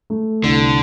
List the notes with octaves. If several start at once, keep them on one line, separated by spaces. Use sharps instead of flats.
A3
C2 D3